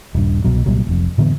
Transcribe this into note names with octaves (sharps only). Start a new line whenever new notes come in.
D#1 G2
C2 B2 F#3
C2 A#2 F#3 G3
F1 F2
A2 D3 E3 B3